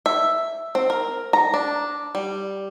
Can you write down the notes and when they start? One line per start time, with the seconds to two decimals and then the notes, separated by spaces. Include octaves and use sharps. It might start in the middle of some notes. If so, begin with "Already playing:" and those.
0.06 E5
0.75 C4
0.90 A#4
1.33 A#5
1.54 D4
2.15 G3